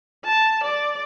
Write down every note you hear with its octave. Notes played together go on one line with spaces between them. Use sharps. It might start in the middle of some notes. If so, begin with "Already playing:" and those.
A5
D5